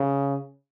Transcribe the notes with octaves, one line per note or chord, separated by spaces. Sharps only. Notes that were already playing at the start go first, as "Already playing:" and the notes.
Already playing: C#3